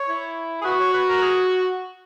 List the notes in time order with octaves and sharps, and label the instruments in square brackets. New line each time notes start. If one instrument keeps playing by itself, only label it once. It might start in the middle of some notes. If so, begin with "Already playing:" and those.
Already playing: [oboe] C#5
[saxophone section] E4
G#4
[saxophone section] F#4 [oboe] B4
[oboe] C#5
B4
A#4
G#4